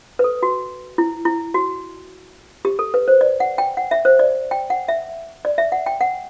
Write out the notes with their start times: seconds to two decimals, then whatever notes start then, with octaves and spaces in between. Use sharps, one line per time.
0.19 B4
0.24 A4
0.43 F#4
0.98 E4
1.25 E4
1.54 F#4
2.65 G4
2.79 A4
2.94 B4
3.08 C5
3.21 D5
3.40 F#5
3.58 G5
3.77 F#5
3.91 E5
4.05 C5
4.19 D5
4.51 G5
4.70 F#5
4.88 E5
5.45 D5
5.58 E5
5.72 F#5
5.86 G5
6.01 F#5